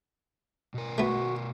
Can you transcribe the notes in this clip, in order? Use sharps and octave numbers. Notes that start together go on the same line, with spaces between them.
B2 A#4
A3 B3 F#4